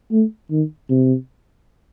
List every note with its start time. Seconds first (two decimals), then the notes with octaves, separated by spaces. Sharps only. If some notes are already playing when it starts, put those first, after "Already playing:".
0.12 A3
0.51 D#3
0.90 C3